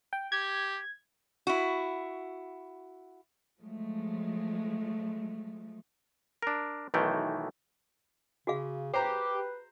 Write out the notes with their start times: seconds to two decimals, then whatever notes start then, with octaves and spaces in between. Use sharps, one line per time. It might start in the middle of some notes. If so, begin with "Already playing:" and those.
0.13 G5
0.32 G4 G#6
1.47 E4 F#4
3.61 F3 F#3 G#3 A3
6.42 D4 A#4
6.94 B1 D#3 E3 A3 G5
8.47 C#3 F#4 G#4 F5
8.94 G4 B4 C5 A#5